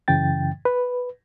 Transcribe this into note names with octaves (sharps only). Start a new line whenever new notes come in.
F#2 C#3 E3 G5 A6
B4